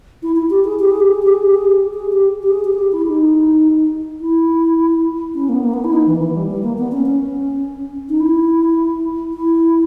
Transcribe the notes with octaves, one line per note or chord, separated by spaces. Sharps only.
E4
E4
G4
G#4
G4
G#4
G4
G#4
G4
G#4
G4
G#4
G4
G#4
G4
G4
G#4
G4
G#4
G4
E4
D#4
E4
C#4
A#3
B3
A#3
B3
E4
D#4
E3
E3
G3
G3
A#3
B3
C#4
C#4
D#4
E4
E4